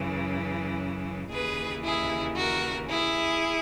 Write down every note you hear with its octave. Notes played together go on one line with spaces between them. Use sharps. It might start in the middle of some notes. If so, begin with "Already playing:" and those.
Already playing: F#2 C#3 E3
D#2 C#3 E3 G#4 B4
E4 G#4
F#4 A#4
E4 G#4